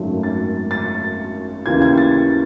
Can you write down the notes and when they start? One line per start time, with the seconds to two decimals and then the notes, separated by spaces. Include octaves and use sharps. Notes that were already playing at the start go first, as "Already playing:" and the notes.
Already playing: G#1 F#2 D#3 F#3 A3
0.23 A6
0.71 A6
1.66 D#2 C#3 E3 G#6
1.82 G#6
1.98 A6